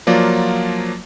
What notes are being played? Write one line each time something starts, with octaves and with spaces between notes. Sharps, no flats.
F3 F#3 A#3 F4 D5